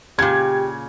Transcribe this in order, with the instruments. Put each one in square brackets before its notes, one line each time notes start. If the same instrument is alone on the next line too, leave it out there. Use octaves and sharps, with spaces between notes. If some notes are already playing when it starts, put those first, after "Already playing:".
[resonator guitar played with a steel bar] A#2 C#3 [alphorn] G4 [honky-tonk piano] G#6